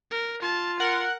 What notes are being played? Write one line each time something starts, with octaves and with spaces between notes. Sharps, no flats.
A#4
F4 A5
A#4 F#5